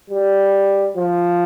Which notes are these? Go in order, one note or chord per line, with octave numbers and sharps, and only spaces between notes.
G3
F3